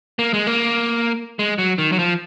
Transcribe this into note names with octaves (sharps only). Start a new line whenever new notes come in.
A#3
G#3
A#3
G#3
F#3
D#3
F#3
F3